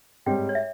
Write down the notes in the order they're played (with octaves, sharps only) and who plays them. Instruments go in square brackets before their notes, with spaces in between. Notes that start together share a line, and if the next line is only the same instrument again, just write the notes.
[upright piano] G#2 G3 C4 G4 C#5 [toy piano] G5
[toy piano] C#5
E5